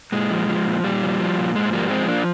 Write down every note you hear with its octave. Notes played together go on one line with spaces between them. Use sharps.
A#2 G#3
F3
F3
A#2
A#2 G3
F3
F3
A#2
G#2 G#3
F3 G3 A#3
F3 G#3 C4
A#3 D4